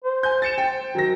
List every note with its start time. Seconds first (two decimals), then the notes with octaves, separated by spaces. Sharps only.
0.05 C5
0.23 G#5 G6
0.42 A6 C#7 E7
0.58 C5 G5
0.95 D#3 F#3 A#6